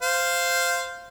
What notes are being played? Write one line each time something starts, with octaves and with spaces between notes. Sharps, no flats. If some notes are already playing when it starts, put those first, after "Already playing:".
C5 F5